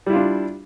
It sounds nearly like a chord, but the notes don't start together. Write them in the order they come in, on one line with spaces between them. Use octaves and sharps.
G3 E4 F4 D4